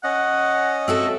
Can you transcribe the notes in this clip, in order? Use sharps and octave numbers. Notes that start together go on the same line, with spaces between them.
C#4 D#5 F#5
C4 F#4 A4 E5